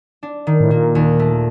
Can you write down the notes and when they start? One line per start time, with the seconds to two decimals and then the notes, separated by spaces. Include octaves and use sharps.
0.23 D4
0.47 D#3
0.61 A2
0.71 A#2 A#3
0.95 D#2
1.19 A3